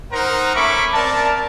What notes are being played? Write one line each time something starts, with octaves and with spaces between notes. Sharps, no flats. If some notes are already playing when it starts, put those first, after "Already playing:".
D#4 A#4 C5 F#5 A#5
A3 C#4 E5 B5 C#6 D6
C4 A#4 D5 A5